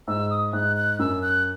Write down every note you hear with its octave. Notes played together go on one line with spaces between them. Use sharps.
G#2 E6
D#6
G#2 F#6
F#6
F#2 E6
F#6